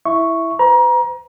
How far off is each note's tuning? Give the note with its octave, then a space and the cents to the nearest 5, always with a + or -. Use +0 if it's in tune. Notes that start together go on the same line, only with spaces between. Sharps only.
E4 +0 E5 +0 C#6 +0
B4 +45 A#5 +30